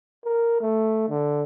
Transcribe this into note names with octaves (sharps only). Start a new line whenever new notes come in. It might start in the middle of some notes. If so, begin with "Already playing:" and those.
A#4
A3
D3